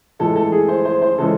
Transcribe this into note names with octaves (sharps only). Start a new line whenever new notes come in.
A2 E3 G#3 A4
A4
G#4
C5
C5
C5
C#3 E3 G#3 A4